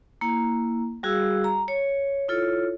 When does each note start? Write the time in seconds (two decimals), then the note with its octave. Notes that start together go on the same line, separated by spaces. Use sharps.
0.21 A#3 E4 A#5
1.03 G3 F#4 G#4 F5 E6
1.44 A#5
1.68 C#5
2.29 E4 F4 A4 C#5